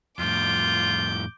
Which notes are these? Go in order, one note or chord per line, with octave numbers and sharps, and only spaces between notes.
F2 A2 F4 D6 G6